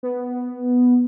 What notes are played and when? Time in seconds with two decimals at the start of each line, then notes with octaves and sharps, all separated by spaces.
0.03 B3